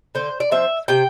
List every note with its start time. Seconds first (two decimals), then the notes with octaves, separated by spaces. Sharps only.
0.15 D3 C5
0.40 D5
0.51 F3 C4 E5
0.88 C3 G5